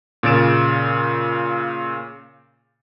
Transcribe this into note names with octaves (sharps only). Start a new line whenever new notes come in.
A#2 C#3 A6 D7 E7